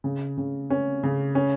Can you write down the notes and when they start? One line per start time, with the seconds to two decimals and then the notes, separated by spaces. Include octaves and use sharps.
0.04 C#3
0.38 C#3
0.70 C#4
1.03 C#3
1.35 C#4